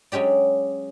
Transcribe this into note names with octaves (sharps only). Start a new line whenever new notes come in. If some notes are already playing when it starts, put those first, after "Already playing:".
F#3 G#3 C#4 G4 D5